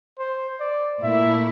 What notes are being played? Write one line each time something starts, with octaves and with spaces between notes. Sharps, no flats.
C5
D5
A#2 A3 E4 E5